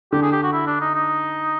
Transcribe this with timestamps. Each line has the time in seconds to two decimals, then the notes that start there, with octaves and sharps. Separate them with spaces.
0.12 D3 G4
0.22 G#4
0.32 G4
0.43 F#4
0.53 E4
0.67 D4
0.81 D#4
0.94 D#4